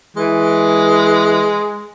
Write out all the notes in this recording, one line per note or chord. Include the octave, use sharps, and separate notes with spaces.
E3 G#3